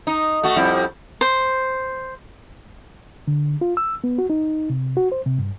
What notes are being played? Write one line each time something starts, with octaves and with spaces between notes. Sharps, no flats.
D#4
A3 F#4
F2 G3 E4
C5
D3
F4
E6
B3
F#4
D#4
C3
F#4
C5
C3
G2